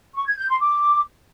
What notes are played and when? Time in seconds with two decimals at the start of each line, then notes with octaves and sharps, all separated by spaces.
0.14 C#6
0.26 G#6
0.37 G6
0.49 C6
0.60 D6